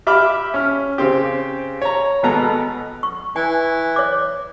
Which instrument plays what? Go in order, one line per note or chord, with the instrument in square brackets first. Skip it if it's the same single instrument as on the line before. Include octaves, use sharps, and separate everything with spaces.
[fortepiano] G4 E5 B5 D6 F6
C#4 F6
C#3 C4 G4
C#5 A#5
G#1 B2 B3 A4 A#5
[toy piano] C#6
[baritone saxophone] E3 [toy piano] G#5
[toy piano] C#5 D6